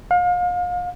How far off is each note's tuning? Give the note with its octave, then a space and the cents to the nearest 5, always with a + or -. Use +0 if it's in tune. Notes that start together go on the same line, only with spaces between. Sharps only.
F5 +35